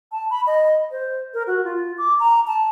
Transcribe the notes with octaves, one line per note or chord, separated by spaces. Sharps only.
A5
B5
D#5
C5
A#4
F#4
F4
D6
A#5
A5